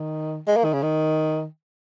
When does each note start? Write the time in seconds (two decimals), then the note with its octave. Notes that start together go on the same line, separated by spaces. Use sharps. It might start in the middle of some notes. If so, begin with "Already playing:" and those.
Already playing: D#3
0.47 G#3
0.56 A#3
0.64 D#3
0.73 C#3
0.82 D#3